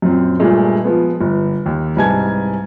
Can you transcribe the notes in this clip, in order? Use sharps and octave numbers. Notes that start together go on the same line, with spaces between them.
F#2 A#2 C4
G2 A#2 G#3 A3
F3 G#3 B3
G1
D#2
C2 G#2 B4 G#5 A5 G#6